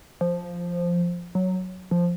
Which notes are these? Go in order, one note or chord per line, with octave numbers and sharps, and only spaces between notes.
F3
F#3
F3